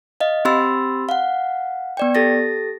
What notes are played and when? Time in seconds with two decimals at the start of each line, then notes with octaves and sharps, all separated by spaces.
0.20 D#5 F5
0.45 C4 G4 B5 C6 E6 A6
1.09 F5 F#5
1.97 B3 D5 G5
2.15 G4 A4 A6 A#6